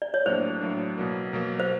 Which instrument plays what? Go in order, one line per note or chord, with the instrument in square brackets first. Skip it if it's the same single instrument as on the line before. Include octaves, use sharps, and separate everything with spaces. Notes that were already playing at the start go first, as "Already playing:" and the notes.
[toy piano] D5
C#5
[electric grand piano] A2 F#3 A#3 D4 [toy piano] C5
[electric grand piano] A2 F#3 A#3 D4
B2 F#3 A#3
B2 F#3 A#3
[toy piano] C5